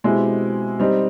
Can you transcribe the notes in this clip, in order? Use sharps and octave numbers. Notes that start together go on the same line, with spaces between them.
B2 G#3 C4 E4 G4
G3 C4 D#4